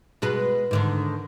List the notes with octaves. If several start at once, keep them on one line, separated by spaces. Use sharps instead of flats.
B2 G#3 B4
G#2 D3 D#3